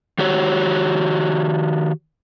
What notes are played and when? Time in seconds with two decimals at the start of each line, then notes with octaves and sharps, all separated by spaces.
0.18 D#3 F#4 G4 C#5